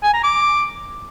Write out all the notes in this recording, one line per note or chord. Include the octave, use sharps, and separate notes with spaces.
G#5
A#5
D6